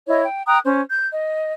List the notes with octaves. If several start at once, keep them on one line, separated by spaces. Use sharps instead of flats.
E4 C#5 D#5
G5
G5 A#5 D#6 F#6
C#4 C5
G6
D#5